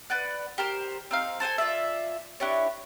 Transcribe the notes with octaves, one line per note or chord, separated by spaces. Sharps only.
B4 D5 F#5
G4 A#4 C5
C4 D#4 F5
A4 C5 G5 G#5
F4 D5 E5
D4 E4 G4 C#5